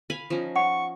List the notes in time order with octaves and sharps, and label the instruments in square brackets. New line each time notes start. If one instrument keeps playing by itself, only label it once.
[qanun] F5 G#5 B5
F3 C#4 D#4
[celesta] F#5 [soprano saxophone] C#6